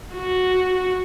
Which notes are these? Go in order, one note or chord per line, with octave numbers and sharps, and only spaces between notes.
F#4